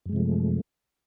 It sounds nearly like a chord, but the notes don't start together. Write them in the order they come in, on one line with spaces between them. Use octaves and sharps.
F#2 G#3 C3 F3 A3